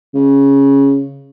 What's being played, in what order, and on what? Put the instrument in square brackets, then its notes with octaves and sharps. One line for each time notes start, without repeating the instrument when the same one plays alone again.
[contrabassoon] C#3